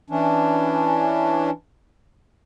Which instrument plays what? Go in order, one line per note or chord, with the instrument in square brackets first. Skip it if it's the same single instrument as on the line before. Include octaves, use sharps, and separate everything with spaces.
[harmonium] E3 C#4 D4